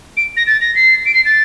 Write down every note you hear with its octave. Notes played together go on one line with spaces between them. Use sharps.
D7
A#6
A6
A#6
C7
D7
C7
A6